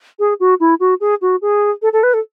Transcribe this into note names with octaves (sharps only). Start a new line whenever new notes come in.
G#4
F#4
E4
F#4
G#4
F#4
G#4
A4
A4
B4
A4